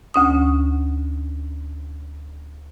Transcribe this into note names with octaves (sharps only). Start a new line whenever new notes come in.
D2 C#4 D#6